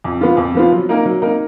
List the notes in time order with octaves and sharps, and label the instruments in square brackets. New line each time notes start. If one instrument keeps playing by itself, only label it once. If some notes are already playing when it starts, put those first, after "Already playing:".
[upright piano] F2
F3 B3 F4
F2
F3 B3 F4
F#3
A#3 D#4 A#4
F#3
A#3 D#4 A#4